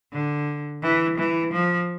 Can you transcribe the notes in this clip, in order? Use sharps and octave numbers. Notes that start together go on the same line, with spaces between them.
D3
E3
E3
F3